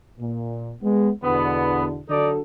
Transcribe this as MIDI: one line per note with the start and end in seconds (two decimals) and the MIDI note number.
0.19 0.72 46
0.82 1.09 56
0.82 1.09 59
1.23 1.99 40
1.23 1.99 47
1.23 1.99 50
1.23 1.85 59
2.10 2.41 50
2.10 2.41 54
2.10 2.30 62
2.10 2.30 63
2.10 2.41 69
2.10 2.30 74